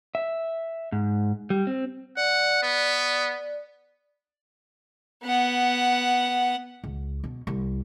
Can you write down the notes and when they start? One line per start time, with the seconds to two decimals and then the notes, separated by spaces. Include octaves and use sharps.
0.15 E5
0.92 G#2
1.50 G3
1.67 C4
2.17 D5 F#5
2.62 B3
5.24 B3 F#5
6.84 C#2
7.24 B2
7.47 C2